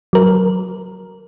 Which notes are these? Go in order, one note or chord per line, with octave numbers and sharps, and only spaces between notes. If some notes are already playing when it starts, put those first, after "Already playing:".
F#3 A#4